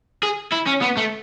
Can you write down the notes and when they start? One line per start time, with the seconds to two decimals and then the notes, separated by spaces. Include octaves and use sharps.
0.23 G#4
0.52 E4
0.67 C#4
0.82 B3
0.98 A3